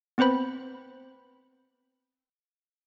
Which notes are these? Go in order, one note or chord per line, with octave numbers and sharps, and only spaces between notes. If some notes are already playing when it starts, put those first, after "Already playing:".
B3 C4 B4 C5 B5